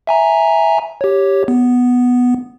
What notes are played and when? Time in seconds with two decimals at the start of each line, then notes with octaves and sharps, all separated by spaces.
0.07 E5 G#5 A#5
1.01 G4 C#5
1.48 B3